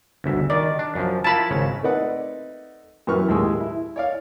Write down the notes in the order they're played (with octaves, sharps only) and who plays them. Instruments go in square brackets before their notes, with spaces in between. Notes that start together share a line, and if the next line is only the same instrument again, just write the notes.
[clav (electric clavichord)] G1 D2 E5
[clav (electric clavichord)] D#3 [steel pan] D5
[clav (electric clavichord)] D4
F#2 F3
[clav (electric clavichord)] E4 F4 A#4 [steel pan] A5 B5
[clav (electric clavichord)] G#1 C#3 C#5
[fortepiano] A3 C4 D#4 B4 D5 F#5
F#2 E3 B4 C#6 F6
D#2 A2 G#3 G#4 E6
E4
C#5 D5 F5